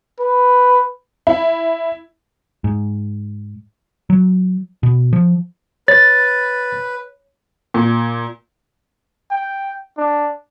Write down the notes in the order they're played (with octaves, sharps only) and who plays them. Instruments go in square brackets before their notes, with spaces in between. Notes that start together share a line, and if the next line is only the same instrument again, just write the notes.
[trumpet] B4
[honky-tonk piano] E4
[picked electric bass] G#2
F#3
B2
F3
[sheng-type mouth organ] B4 [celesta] C#5 [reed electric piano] A6
[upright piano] A#2
[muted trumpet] G5
D4